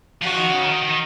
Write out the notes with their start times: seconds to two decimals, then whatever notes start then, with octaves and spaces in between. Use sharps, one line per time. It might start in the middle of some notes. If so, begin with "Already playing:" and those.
0.22 F3 F#4
0.36 D#3
0.49 C#3
0.63 D#3
0.83 D#3